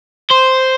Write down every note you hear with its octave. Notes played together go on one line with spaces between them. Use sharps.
C5